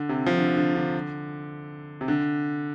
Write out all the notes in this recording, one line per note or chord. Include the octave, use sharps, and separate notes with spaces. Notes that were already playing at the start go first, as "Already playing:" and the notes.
Already playing: D3
C3
F3
D3
D3
D3
C3
D3